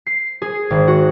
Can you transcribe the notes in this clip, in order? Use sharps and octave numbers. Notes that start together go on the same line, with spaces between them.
C7
G#4
G#1
F#4